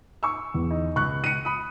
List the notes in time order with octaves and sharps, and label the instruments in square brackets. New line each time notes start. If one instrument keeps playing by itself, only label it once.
[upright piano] C#6 E6
[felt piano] E2
[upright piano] D#4
[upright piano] C#2 [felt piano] C#6 F#6
[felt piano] C#7 D#7
[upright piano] B5 D#6